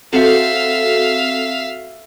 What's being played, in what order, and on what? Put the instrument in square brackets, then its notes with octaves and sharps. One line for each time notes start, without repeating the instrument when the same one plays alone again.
[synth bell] C4 F#4 A4 [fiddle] E5 F5